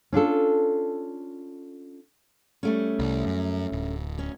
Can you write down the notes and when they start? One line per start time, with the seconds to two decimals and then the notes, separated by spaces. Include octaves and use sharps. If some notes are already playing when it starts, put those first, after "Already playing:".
0.13 C#4 D4 F4 A4
2.63 G3 A3 C#4
2.99 C2
3.26 F#2
3.72 D1
4.19 C#4